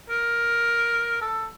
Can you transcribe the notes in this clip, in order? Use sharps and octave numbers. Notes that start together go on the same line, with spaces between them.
A#4
A4